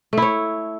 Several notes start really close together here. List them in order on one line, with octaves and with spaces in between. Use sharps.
A3 E4 C#5